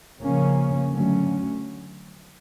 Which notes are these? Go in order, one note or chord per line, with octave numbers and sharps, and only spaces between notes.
C#3 F3 A#3 C#4
D3 F#3 A3 C#4